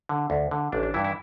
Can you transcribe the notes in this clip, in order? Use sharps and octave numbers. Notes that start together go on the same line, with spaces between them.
D3
D2
D3
A1 D4
D4
G2 E3 E4
E4